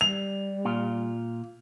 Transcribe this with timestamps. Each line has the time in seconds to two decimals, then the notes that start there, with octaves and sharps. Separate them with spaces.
0.01 G3 F7
0.65 A#2 F4